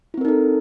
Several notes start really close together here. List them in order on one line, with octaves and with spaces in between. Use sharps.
E4 C4 A#4 D#4 A4